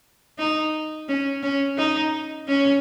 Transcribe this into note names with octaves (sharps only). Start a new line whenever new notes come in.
D#4
C#4
C#4
D#4
C#4